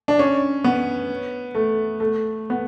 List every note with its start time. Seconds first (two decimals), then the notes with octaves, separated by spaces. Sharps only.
0.08 D4
0.19 C#4
0.64 B3
1.55 A3
2.00 A3
2.50 B3